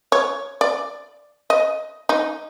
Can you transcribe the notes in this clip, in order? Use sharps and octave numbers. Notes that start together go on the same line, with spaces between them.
C#5
D5
D#5
D#4